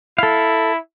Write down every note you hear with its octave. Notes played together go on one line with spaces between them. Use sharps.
E4 A4 F5